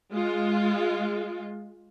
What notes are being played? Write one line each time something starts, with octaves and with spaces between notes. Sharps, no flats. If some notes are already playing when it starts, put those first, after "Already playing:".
G#3 F4